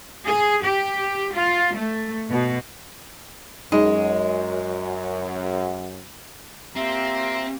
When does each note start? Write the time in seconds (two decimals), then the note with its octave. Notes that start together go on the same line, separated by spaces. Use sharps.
0.23 G#4
0.61 G4
1.33 F4
1.74 A3
2.30 B2
3.72 F#2 G#3 D#4 D#5
6.76 A#3 C4 F4 G4 E5 A#5